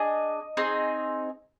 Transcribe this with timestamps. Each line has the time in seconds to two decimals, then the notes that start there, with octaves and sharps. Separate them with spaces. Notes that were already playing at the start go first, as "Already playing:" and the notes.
Already playing: D4 G#4 D#5
0.57 C4 D#4 G#4